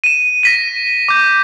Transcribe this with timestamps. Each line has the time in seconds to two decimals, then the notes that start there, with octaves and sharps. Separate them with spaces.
0.04 D#7 E7
0.43 A#6 B6 D#7
1.08 D6 G6